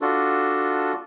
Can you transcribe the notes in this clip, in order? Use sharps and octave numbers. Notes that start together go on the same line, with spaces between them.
D4 F4 F#4 A4